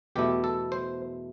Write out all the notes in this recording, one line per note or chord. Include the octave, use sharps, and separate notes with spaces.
E2 B2 A3 E4 G4
A4
C5